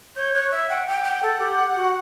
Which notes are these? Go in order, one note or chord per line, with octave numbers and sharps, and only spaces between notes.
C#5 G6
C#5 F#6
E5 E6
F#5 G5
F#5 G5
G5
A4
G4
F#4